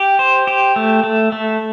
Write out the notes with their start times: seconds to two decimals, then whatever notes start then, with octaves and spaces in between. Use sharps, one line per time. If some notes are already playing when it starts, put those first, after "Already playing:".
Already playing: G4
0.19 C5
0.47 G4
0.76 A3
1.03 A3
1.32 A3